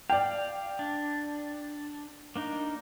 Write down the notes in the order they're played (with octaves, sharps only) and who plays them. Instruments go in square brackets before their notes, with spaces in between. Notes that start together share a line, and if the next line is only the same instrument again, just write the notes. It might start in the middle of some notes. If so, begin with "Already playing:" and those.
[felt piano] D5 G5 [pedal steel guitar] F5
[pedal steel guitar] D4
A#3 D4 D#4